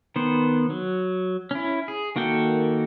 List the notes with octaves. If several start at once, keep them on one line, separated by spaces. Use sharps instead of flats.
D#3 B3 C5
F#3
C#4 E4
G#4
D#3 A#3 F#4 A4 G5